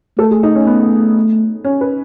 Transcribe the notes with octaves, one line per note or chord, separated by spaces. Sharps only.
A3 A4
G#4
D#4
C#4
B3
C#4
B4